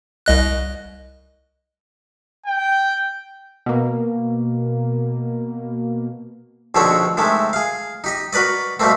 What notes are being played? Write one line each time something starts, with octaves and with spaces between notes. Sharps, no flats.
C2 D#5 F#6
G5
B2 A#3
A#1 B2 D3 D#3 C4 C#5
C3 D#3 G#3 A3
G#4 F5
D#4 G4 D#5
F#4 A#4 B4 D5 D#5
B2 G3 A3 A#3 C4